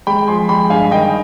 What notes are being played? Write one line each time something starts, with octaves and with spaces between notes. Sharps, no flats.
G#3 G5 B5
F3 G#5 C6
G#3 G5 B5
G2 F5 G#5
D#3 D#5 G5